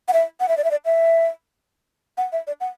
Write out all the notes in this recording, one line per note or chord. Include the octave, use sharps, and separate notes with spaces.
F#5
E5
F#5
E5
D5
E5
D5
E5
F#5
E5
D5
F#5